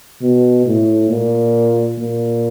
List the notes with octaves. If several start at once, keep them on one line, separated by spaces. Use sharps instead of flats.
B2
A2
A#2
A#2